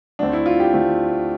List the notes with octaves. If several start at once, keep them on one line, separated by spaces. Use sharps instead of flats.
D2 D3 A3 C4 D4
E4
F4
G4
D3 A3 C4